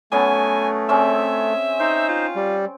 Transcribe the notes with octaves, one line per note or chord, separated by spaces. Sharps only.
F#3 A3 B3 C#4 G#5
C4 C#4 G#4 E5
D#4 C5 G5
F4
G3